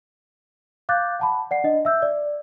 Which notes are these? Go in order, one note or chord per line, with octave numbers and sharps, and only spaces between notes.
F5 D6 F#6 G6 A6
F#5 A5 B5
D5 F#5 C7
D4 D#5
E5 E6 G6
D5